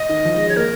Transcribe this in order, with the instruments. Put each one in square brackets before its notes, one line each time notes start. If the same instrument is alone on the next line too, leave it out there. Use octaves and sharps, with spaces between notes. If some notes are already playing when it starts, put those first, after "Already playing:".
Already playing: [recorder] D#5
[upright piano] D#3
F3
G#3
[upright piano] G#3 [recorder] C#5
[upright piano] A#3 [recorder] A#4